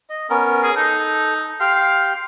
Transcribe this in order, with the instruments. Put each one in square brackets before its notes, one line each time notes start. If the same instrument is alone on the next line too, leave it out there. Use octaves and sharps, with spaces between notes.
[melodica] D#5
B3 C#4 A#4
[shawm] G#4
[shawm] D#4 [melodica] A4
[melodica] G4 G5 C6 [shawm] F5